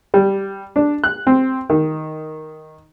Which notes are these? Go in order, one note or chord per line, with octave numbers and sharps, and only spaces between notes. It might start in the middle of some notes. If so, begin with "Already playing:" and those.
G3
D4
F#6
C4
D#3